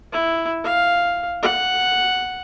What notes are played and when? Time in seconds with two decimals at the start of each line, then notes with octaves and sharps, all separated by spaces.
0.13 E4
0.64 F5
1.42 F#5